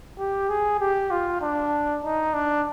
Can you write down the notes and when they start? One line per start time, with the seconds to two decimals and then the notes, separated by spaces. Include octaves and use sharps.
0.18 G4
0.49 G#4
0.80 G4
1.11 F4
1.41 D4
2.04 D#4
2.34 D4